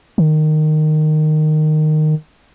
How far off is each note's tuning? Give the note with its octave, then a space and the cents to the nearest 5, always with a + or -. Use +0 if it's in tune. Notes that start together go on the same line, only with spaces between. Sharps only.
D#3 -15